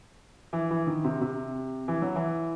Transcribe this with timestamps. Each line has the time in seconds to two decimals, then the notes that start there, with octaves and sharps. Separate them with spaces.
0.53 E3
0.71 E3
0.87 D#3
1.05 C3
1.21 C3
1.88 E3
2.02 F#3
2.16 E3